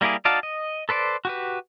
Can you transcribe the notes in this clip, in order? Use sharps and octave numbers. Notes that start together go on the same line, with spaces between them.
G3 A#3 E4 G4 G#4
D#4 F#4 D5 F5 A5
D#5
A4 B4 C5 D5
F#4 G4 B4